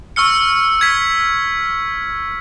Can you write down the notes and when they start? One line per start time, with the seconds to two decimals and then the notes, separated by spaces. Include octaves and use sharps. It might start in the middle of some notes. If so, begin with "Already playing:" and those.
0.16 C#6 E6 F6 C#7
0.81 G#6 B6